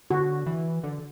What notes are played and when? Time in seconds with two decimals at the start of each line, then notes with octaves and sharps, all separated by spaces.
0.10 D3 F#4
0.46 E3
0.84 D3